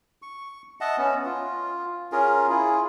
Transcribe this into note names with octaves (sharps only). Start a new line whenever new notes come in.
C#6
D#5 E5 F#5 A5
B3 C#4
F4
C#4 F4 G#4 A#4
E4 F4 G#4